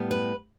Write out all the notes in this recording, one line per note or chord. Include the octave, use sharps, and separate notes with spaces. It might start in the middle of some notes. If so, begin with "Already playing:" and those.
Already playing: A2 G3 B3
B4